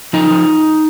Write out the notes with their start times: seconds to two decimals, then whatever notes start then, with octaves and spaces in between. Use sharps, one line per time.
0.13 F3 D#4
0.31 F3